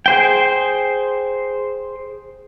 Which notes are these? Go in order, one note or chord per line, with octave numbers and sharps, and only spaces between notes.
G#4 C5 G5